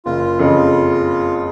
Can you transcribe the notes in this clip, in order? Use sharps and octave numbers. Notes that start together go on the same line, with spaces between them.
F#1 F4
F2 C#3